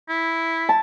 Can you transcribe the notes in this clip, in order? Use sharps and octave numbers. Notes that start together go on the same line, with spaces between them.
E4
A5